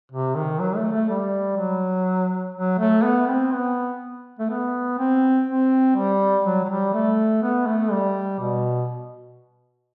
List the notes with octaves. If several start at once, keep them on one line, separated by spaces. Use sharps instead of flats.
C3
D#3
F#3
A3
A3
G3
F#3
F#3
A3
B3
C4
B3
A3
B3
C4
C4
G3
F#3
F#3
G3
A3
B3
A3
G3
B2